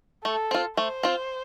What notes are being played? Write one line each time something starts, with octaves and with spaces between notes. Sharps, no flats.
A3 A4
C4 F4
A3 C5
C4 F4